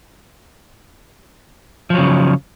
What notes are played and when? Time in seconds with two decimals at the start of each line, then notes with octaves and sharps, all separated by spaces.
1.90 F3
1.94 F#3
1.98 C#3